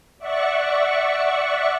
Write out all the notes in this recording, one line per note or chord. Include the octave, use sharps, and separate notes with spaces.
D5 E5 F#5 C#6